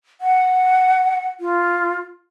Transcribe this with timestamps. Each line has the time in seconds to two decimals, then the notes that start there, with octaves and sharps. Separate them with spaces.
0.21 F#5
1.40 F4